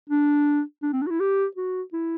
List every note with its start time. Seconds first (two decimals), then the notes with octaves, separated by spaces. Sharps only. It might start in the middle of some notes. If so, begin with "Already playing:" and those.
0.10 D4
0.83 D4
0.93 C4
1.02 D4
1.07 F#4
1.10 E4
1.20 G4
1.56 F#4
1.93 E4